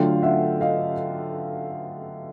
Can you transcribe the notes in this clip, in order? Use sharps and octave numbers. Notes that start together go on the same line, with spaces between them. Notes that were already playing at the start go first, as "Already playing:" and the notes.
Already playing: D3 F#3 A3 D4 F4 F5 G5
E5 F#5
D#5 F5